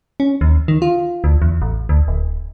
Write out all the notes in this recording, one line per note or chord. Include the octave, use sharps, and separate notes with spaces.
C#4
D#2
D#3
F4
D2
E2
A1
D2
D1